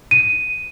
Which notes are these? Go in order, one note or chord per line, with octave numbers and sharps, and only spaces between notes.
D#7